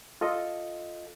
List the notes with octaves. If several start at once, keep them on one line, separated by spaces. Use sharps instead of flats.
F4 A4 D#5